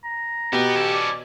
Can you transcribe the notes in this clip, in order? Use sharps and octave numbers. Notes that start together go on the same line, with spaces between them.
A#5
B2 B3 G4
C#4 A4
D5